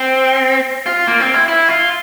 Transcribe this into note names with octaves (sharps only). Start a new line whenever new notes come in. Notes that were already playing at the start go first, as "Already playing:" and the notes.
Already playing: C4
F4
A#3
C4
E4
E4
F4